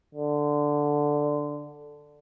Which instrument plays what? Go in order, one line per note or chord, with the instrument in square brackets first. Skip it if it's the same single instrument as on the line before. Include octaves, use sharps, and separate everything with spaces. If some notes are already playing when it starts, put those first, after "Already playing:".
[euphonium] D3